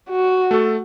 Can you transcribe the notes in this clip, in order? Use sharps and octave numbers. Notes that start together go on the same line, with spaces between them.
F#4
A3 A4